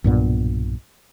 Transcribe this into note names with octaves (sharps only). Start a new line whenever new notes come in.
B1 G2 A#2 B3